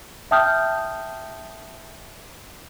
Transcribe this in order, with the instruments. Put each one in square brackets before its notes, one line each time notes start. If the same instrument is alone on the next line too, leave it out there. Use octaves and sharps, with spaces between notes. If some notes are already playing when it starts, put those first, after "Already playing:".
[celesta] E5 G5 A5 D#6 F6 G6